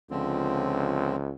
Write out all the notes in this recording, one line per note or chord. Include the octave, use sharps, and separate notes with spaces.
C#2 D3 F3 C4